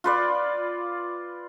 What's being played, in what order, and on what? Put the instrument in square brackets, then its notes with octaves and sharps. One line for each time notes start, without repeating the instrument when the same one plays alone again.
[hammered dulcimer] F4 B4 D5